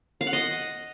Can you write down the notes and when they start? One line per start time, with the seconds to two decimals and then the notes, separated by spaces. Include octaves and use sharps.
0.21 F5
0.27 F#5
0.33 D#5